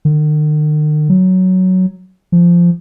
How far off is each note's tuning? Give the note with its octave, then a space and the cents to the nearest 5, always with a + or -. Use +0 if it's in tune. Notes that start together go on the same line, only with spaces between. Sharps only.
D#3 -45
F#3 +5
F3 -10